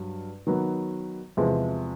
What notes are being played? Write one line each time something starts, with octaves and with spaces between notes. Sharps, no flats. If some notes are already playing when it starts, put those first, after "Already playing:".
Already playing: G2 F#3
D#3 F#3 B3
E2 C3 F3 G#3